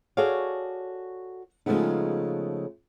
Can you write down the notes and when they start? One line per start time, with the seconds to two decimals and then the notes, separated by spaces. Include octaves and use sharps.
0.17 F#4 G#4 A4 C#5 D5 F5
1.66 C#3 F3 G#3 A3 B3 D#4